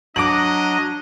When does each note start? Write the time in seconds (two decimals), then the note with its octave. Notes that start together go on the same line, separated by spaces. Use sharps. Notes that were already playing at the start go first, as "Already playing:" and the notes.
0.16 F#3 D4 D#5 A#5 D6 D7 F#7